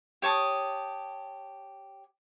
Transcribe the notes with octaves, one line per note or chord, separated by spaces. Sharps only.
G4 C#5 A5 D#6